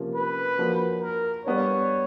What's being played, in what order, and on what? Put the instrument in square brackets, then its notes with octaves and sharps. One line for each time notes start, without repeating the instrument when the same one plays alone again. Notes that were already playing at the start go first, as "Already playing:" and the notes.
Already playing: [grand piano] C3 F3 A#3 C#4 F4
[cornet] B4
[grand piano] F3 A#3 D4 F#4
[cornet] A#4
[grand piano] G3 B3 D4 [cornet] C#5